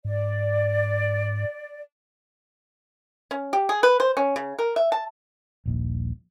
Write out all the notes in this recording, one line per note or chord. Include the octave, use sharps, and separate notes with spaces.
G#2 D5
C#4
G4
G#4
B4
C5
C#4
C#3
A#4
E5
A5
D#1 A#1 D#2